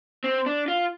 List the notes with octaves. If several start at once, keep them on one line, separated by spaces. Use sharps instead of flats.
C4
D4
F4